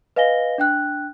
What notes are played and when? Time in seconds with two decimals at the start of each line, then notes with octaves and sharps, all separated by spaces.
0.16 B4 D#5 F5 G#5 A#6 G7
0.58 D4 G5 F#6